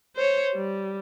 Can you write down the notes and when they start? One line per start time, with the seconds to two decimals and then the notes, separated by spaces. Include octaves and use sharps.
0.16 C5 C#5
0.55 G3